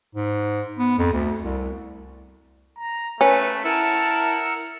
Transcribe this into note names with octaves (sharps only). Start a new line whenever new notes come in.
G#2
B3
F2
D2
C2
A#5
A3 C#4 B4
E4 A#4 F#5 A5 E6